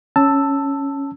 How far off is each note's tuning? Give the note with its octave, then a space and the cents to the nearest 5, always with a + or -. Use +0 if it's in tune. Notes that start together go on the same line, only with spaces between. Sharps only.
C#4 +0 A5 +10 E6 +0